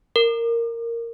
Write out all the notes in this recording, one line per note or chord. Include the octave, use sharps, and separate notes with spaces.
A#4